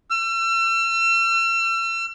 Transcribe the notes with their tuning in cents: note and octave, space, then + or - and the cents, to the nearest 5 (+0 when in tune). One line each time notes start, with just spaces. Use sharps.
E6 +40